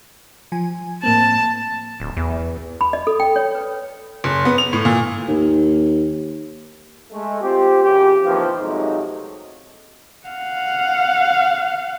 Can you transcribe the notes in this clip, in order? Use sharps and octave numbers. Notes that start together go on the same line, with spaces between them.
F3 G#5
A2 A#3 C4 A5
D1
E2
B5
D#5
A4
G5
C#5
B4
F#1
B3
F7
A2
A#2
D#2
G#3 A3
C4 F4 G4
F#2 C#3 G4
D#2 C3 E3 F3
C3 F#3 G#3 A3 D#4
F5 F#5